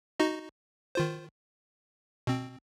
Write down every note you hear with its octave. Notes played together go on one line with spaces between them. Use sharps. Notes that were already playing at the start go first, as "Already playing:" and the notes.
D#4 F#4 D#5
D#3 F4 C5
B2 C4